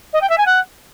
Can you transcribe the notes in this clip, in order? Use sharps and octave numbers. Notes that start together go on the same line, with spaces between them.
D#5
G5
E5
G#5
F#5